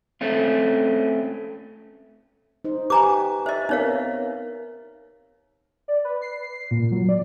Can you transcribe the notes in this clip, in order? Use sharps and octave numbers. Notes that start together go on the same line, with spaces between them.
A3 C4 C#4 F4
D#4 C5
G4 B4 G#5 A#5 D6
C5 D#5 E5
B3 C4 D#4 A#4 C#5 F5
D5
B4
C7
A#2
F#3
D5